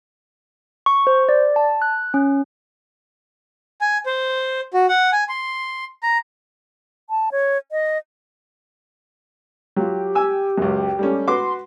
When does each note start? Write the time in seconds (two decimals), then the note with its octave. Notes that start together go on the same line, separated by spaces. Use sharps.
0.86 C#6
1.07 C5
1.29 D5
1.56 A5
1.82 F#6
2.14 C#4
3.81 G#5
4.06 C5
4.74 F#4
4.89 F#5
5.13 G#5
5.29 C6
6.03 A#5
7.10 A5
7.32 C#5
7.72 D#5
9.76 F#3 F4 G4
10.15 G#5 E6
10.58 C#2 F#2
10.99 G3 A3 C#4
11.28 F#4 B4 C6 D6